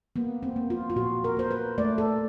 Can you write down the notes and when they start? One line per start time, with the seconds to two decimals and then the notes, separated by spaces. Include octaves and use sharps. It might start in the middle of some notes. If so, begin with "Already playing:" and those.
0.16 A#3 B3
0.43 C4
0.56 A#3
0.70 F4
0.90 F4
0.96 A#2 F#4
1.24 A#4
1.37 A#3 C5
1.51 B4
1.78 A3 D5
1.98 A4